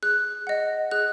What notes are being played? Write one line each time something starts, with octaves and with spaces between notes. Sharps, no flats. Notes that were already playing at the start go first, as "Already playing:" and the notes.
G#4 F#6
D#5 F#5
G#4 F#6